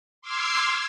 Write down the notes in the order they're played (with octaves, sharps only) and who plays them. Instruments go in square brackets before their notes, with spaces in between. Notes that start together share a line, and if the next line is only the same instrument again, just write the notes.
[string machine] C6 D6 E6 F6 G#6 C7